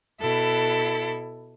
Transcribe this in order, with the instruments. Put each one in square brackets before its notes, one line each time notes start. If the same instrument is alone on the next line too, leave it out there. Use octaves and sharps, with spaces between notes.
[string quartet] B2 E4 A4